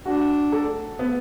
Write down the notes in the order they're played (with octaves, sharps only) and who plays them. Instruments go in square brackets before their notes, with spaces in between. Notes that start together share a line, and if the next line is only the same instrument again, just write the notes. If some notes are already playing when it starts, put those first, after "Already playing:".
[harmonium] D4 [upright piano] F#4
[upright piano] A4
B3